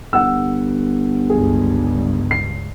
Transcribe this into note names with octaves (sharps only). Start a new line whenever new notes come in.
G1 F#5 E6
C#2 G2 G#4
C7